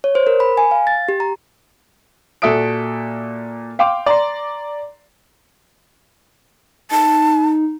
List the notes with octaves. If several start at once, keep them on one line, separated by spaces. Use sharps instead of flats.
C#5
C5
A#4
B5
G#5
F5
A6
G4
A#5
A#2 F#4 A4 E5 D#6 D7
F5 G5 C6 D6
D5 A#5 C6
D#4 A5